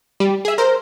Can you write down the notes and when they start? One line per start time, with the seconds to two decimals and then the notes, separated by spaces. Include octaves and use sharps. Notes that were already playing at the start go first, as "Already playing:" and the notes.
0.20 G3
0.45 G#4 E5
0.58 A#4 C5